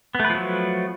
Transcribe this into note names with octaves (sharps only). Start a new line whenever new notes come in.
F3 F#3 A3 B3 B4